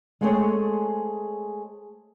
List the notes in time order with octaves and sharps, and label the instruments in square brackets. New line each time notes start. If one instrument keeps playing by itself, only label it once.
[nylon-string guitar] G#3 A3 C4 G#4 A4 C#5